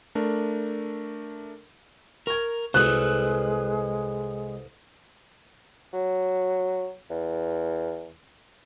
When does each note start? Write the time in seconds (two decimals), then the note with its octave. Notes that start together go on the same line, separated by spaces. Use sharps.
0.15 A3 D4 A#4
2.27 A#4 C#6 G#6
2.74 C2 G#3 A4 B4 C5 D#6 F#6 G7
5.93 F#3
7.10 E2